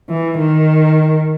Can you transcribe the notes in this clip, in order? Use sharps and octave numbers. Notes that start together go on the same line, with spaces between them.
E3
D#3